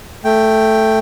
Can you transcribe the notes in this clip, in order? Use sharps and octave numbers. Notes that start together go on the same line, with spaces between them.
A3 G5